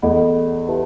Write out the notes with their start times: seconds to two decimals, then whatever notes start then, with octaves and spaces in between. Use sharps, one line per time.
0.02 E2 A4 D#5 F#5 B5
0.68 E4 G4 B4 E5 A5